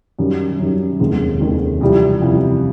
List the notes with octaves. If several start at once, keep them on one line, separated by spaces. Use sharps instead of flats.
F#2 D#3 G3
F#2 D#3 G3
F1 D#2 D#3 G#3
F1 D#2 D#3 G#3
F2 C3 E3 G3
F2 C3 E3 G3